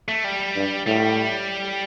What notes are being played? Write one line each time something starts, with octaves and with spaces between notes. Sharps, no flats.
A3
G3
G2
A2 G3